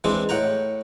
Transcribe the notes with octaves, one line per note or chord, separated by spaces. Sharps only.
E3 G#3 C4 D4
A2 F#5 G5 A#5